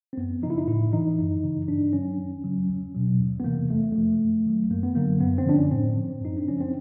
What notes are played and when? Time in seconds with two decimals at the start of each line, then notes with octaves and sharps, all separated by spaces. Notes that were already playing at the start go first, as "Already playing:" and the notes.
0.13 C4
0.17 F#2 B3
0.42 F3 D#4
0.47 C#3 E4
0.58 D#4
0.68 A2 E4
0.93 E3 D#4
1.19 F#2
1.44 C#3 E3
1.68 G2 D4
1.93 D#3 F#3 C#4
2.19 F#2
2.44 C#3 F#3
2.69 E2
2.95 B2 F#3
3.20 E2
3.40 B3
3.44 C3 E3 A#3
3.70 F2 A3
3.92 C3 F3 A3
4.20 F#2
4.46 D#3 F#3
4.71 F#2 A#3
4.83 B3
4.95 D3 F#3 A#3
5.21 F#2 B3
5.38 C4
5.46 D3 F3 D4
5.55 C#4
5.71 A2 C4
5.97 F3
6.21 F#2 D#4
6.37 D4
6.47 C#3 F3 C#4
6.61 C4